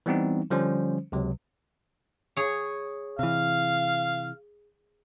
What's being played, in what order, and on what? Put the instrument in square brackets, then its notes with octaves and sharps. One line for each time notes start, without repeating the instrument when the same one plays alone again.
[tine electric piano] E3 G3 B3 C4 D#4
D3 F3 G3 C#4 C5
C#2 C3 F#3
[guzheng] G#4 C#5
[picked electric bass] C3 E3 [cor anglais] F5